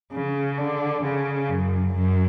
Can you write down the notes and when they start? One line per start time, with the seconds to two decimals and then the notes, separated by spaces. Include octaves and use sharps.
0.13 C#3
0.58 D3
1.03 C#3
1.48 F#2
1.94 F#2